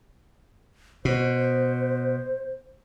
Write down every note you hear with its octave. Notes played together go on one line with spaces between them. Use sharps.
B2 C5